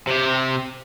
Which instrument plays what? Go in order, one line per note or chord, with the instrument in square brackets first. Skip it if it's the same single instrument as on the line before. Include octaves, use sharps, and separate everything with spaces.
[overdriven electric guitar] C3 G4